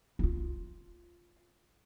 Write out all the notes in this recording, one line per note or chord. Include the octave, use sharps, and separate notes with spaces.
E4 F4